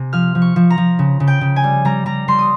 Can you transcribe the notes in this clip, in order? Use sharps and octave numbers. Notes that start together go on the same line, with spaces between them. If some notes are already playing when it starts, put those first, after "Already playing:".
Already playing: C3 G#5
F3 F6
F3
C#6
F3
A#5
F3
C#3
C#3
G5
C#3
G#5
G3
G3 A#5
G3 A#5
G3 C6
D#6